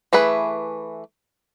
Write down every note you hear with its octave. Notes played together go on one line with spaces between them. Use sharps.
E3 A3 G#4 B4